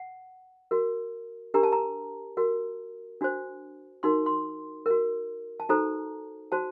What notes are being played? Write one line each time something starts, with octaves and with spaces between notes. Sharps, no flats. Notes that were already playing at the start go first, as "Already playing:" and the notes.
Already playing: F#5
F#4 A#4
D4 G4 A#4 A#5
A5
A#5
F#4 A#4
D4 F#4 C5
D#4 F#4 A#4 C6
C6
F#4 A#4
A5
D#4 F#4 A4 C5 A#5
F#4 C5 A5